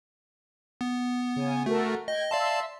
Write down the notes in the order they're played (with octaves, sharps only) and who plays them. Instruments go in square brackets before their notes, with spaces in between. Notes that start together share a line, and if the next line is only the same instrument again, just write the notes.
[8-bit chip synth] B3
[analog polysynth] C#3 G#5
[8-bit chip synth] A3 [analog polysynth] F#4 A4 A#4
[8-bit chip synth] D#5 [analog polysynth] G5 G#6
[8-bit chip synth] D5 F5 A5 [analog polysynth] E5 C6 E6